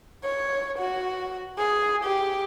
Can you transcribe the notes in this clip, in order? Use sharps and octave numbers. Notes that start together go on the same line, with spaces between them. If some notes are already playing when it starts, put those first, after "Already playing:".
C#5
F#4
G#4
G4